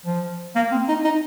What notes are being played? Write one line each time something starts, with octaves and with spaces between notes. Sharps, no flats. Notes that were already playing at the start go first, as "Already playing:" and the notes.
F3
A#3
C4
D#4
D#4